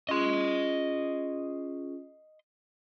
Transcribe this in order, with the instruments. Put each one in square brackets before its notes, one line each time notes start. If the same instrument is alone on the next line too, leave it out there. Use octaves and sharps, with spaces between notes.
[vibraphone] C#4 F4 G#4 [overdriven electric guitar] D#5 C6